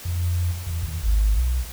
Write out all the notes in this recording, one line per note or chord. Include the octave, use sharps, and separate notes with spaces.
F2
E2
D#2
G#1
B1